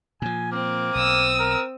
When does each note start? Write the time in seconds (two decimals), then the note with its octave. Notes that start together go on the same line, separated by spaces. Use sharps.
0.22 A#2 F3 G#5
0.52 A#3 C4
0.95 B1 D#6 E6
1.40 A#4